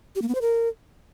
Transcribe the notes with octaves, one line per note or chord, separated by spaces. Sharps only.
G4
A#3
B3
C5
A#4